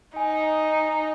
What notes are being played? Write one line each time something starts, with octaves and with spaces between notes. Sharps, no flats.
D#4 G#5